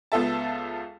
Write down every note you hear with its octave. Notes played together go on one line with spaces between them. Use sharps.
C#2 B3 F4 A4 E5 A5